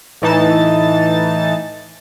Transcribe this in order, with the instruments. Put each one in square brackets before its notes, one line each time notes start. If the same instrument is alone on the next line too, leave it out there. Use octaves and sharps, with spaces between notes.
[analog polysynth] A2 E3 D#4 A5 A6